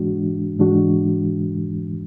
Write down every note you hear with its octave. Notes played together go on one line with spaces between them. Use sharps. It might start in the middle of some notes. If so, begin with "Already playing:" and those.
Already playing: G#2 E3 G#3 D4 F#4
G#2 E3 G#3 D4 F#4